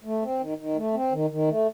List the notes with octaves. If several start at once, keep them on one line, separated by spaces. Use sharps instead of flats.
A3
C4
D#3
D#3
A3
C4
D#3
D#3
A3